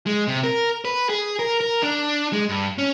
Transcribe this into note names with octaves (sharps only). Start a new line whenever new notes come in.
G#3
C3
A#4
B4
G#4
A#4
A#4
D4
G#3
G2
C#4